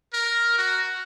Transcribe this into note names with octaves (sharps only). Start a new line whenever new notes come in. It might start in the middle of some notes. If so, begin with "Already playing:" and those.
A#4
F#4